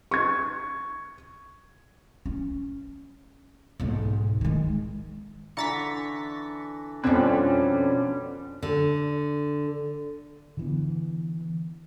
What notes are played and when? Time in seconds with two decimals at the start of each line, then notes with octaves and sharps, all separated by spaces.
0.11 C#6 G#6
2.26 C#4
3.80 B1 G#2
4.41 D#3 G#3
5.57 D3 E3 A#5 C#6 A6 B6
7.04 F2 B2 D3 G3 C4 C#4 B4
8.63 D3
10.57 D3 E3 B3